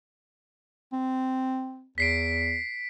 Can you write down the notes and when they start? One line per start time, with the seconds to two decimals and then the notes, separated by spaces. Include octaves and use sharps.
0.93 C4
1.98 E2 B6 C7 D7